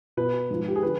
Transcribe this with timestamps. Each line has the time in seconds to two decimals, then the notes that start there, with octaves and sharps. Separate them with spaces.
0.17 B2 B4
0.51 G#2 F3
0.68 G4
0.76 G#4
0.83 D3 F3 B4